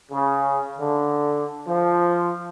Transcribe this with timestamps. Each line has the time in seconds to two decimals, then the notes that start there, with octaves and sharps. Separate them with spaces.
0.11 C#3
0.79 D3
1.67 F3